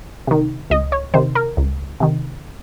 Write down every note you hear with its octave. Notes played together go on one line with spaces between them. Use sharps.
C3 D#3
C#2 D#5
C#5
C3 D#3 C5
A#4
C#2
C3 D#3